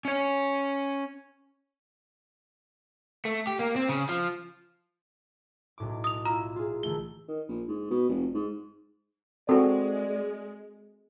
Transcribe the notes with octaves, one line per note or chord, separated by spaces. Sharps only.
C#4 C#5
A3
G4
A#3
C4
C#3
F3
B1 A2 D6
D#6 F7
E4 F4 A#5
F4 G#4
D#3 E3 A3 G7
D#3
A#1
G#2
B2
F1
G#2
G#3 C4 F#4 A4 D5